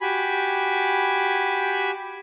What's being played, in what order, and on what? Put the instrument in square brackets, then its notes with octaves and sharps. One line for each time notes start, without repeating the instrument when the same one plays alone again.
[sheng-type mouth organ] F#4 G4 G#5 B5